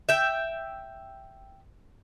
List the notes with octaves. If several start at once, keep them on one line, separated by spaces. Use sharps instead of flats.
E5 G5